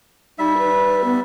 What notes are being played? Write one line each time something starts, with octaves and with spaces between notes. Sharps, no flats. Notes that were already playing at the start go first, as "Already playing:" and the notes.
G3 D#4 E5
B4
B3